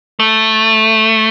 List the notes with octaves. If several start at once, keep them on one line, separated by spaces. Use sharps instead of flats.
A3